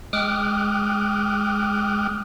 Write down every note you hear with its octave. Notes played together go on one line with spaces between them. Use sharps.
G#3 G5 D6 D#6 F6 F#6